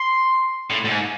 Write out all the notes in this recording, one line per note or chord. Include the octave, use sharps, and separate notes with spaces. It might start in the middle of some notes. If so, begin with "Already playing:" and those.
Already playing: C6
A2
A2
G#2